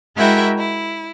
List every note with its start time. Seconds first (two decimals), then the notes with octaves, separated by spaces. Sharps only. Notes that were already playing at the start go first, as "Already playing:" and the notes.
0.17 G#3 E4 F#4 A#4 E5 G5
0.57 E4